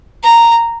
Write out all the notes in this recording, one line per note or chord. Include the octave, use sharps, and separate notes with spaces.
A#5